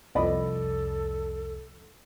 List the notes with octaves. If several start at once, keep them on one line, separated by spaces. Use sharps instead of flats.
C2 F2 A4 D5 D#5 B5